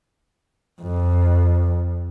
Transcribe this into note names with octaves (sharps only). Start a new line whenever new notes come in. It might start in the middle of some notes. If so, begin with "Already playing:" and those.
F2